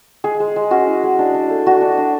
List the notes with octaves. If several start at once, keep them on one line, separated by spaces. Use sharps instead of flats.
G#3 G#4
G#3
G#3
C#4 F#4
E4
G#3
D4
D4
A3
D4 F#4
D4
D4